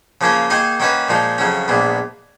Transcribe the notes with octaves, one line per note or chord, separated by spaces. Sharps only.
C#3 F3 A#3 C#4 F4
D#3 A#3 D#4 G#4 D#5
D#3 A#3 C#4 F#4 B4
A#2 F3 G#3 D#4
F2 C#3 F#3 C#4
A#1 A#2 G#3 B3